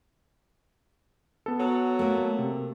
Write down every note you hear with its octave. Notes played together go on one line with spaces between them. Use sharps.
B3 A4
F#3
A3 A#3
C3